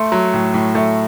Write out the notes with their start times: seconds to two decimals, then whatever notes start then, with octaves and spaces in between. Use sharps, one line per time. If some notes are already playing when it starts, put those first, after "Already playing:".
Already playing: A3 C6
0.12 F#3
0.34 A2
0.54 A2
0.75 A3